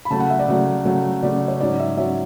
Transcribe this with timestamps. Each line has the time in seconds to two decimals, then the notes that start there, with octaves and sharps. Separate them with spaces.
0.05 B5
0.10 C#3 F#3 A3 A5
0.20 F#5
0.30 E5
0.39 D5
0.48 C#3 F#3 A3
0.85 C#3 F#3 A3
1.23 C#3 F#3 A3 D5
1.48 C#5
1.61 G#2 F#3 C#4 D5
1.80 E5
1.97 F#3 C#4 E5